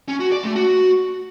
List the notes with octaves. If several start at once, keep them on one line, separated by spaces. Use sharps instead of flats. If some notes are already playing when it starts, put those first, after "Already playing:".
C#4
F#4
D5
A3
F#4